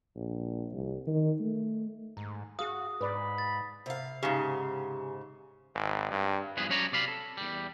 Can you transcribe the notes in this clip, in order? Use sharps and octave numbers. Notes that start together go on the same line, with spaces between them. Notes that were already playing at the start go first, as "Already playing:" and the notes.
A#1
C2
D#3
A3
G#2 A#5
F#4 G#4 F5 D#6
G#2 B4 D5 B5
A6
C3 F5
G#2 C#3 G4 A#5
G#1
G2
E2 G2 F3 B3 G#4 B4
F#3 G3 C#4 C#5 D5 A#5
C3 D5 F5 B5
A4
E2 G3